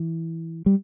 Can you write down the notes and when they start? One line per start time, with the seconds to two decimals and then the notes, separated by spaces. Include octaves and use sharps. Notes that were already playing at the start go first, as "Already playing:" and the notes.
Already playing: E3
0.66 G3